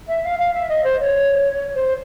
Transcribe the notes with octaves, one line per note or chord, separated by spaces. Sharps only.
E5
F5
F5
E5
D#5
C5
C#5
C5